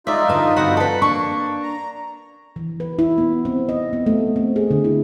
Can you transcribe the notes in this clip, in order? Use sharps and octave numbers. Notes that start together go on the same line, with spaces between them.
G#3 D#4 F4 D5 E5
D3 B4 A5
G2 D3 C4 F#4 F#5 B5
A4 B4
A#3 D4 C#6
A#5
E3
B4
E4
B3
C4
D#5
B3
A3
C4
G#4
D3
E4